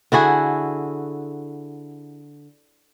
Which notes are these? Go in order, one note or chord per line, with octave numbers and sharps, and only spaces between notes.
D3 E4 F#4 G#4